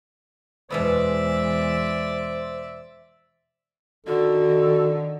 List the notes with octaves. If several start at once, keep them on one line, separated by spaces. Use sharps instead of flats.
E2 B2 E3 G#3 B3 C5 D5 E5
D3 D#3 F#4 A4